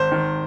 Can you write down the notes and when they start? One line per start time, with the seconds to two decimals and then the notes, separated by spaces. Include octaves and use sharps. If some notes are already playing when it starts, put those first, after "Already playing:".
Already playing: G#1 C5
0.12 D#3